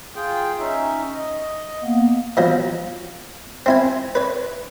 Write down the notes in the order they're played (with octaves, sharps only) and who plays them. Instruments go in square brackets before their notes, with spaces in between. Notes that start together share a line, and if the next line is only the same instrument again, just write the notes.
[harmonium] F4 G#4 G5
C#4 D#4 E5
D#5
[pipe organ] A#3 B3
[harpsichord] B2 F3 F#3
C4 E4 G#5
B4 C#5